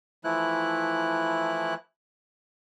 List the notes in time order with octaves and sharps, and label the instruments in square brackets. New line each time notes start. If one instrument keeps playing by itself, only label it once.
[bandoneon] E3 F3 A3 E4 F#6